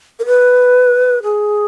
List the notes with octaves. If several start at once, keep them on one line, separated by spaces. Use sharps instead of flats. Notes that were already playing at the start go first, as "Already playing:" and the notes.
A#4
B4
G#4